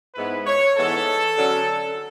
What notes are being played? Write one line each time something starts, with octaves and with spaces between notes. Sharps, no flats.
G#2 G#3 B3 E4 B4
C#5
G#2 E3 G#3 B3 A4
D3 F#3 C#4